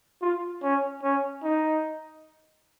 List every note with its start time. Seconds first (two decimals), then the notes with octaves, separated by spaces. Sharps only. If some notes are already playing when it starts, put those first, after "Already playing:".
0.22 F4
0.62 C#4
1.03 C#4
1.43 D#4